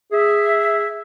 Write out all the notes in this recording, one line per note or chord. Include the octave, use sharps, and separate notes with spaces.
G#4 E5